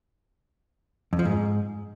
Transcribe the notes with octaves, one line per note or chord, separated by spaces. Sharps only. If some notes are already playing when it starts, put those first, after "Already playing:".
F2
F3
G#2